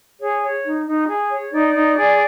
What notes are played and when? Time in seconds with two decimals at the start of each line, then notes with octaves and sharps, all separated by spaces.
0.19 G#4 C#5
0.42 C#5
0.64 D#4
0.86 D#4
1.08 G#4
1.30 C#5
1.51 D#4 D5
1.73 D#4
1.96 G#4